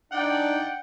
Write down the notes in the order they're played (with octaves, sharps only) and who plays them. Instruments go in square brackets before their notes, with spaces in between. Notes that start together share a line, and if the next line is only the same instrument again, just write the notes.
[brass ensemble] D4 D#4 D5 [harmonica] F#5 G5